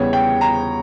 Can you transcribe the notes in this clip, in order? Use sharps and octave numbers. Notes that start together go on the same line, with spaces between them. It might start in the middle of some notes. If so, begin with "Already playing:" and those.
Already playing: E2 C#3 G3 B3 C#5
G5
A#5